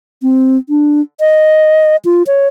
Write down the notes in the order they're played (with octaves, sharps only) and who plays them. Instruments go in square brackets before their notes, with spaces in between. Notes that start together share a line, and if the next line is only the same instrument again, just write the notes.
[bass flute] C4
D4
D#5
F4
C#5